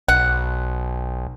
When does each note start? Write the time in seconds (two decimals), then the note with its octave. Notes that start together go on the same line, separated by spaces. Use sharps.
0.08 B1 F#5